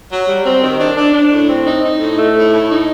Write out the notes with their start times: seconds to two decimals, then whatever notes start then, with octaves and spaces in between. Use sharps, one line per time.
0.11 F#3
0.27 G3
0.44 C4
0.62 D#3
0.79 D4
0.96 D4
1.14 D4
1.31 A2
1.48 C4
1.66 D#4
1.84 D#4
2.00 A2
2.18 A3
2.35 A2
2.52 A2
2.70 D#4